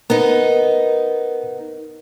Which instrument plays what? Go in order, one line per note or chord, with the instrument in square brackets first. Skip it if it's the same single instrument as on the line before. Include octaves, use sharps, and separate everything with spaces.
[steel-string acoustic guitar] B3 D#4 [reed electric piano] A#4